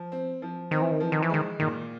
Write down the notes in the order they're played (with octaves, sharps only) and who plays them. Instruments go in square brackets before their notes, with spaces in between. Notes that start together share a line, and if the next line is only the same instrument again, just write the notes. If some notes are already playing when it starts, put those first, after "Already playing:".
Already playing: [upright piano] F3
C4
F3
[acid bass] D#3 [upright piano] C4
[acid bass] E3
D#3
[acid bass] E3 [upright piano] F3
[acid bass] D#3
E3
[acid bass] D#3 [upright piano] G#3
[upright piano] A#2 [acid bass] D#3